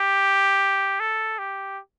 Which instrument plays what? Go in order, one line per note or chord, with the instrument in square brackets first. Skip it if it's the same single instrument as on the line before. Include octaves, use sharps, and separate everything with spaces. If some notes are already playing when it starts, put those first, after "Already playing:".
Already playing: [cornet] G4
A4
G4